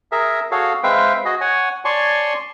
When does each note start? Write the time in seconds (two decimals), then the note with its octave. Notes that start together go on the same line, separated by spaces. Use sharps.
0.12 G#4 A#4 E5
0.51 F#4 G#4 A4 C#5 F5
0.83 G#3 C4 B4 E5 F5 G5
1.25 F#4 G#4 D#5
1.41 C#5 F#5 G#5
1.85 C#5 D5 G#5 A5 C6 C#6